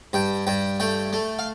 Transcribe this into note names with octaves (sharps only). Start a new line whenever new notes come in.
G2 G5
G2 G5
A3 G5
A3
F5